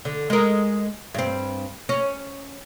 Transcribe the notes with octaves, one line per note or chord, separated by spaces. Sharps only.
D3
G#3 A#4
G2 C4
C#4